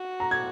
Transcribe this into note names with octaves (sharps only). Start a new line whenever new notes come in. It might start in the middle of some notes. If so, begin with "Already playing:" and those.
Already playing: F#4
A#5
G#6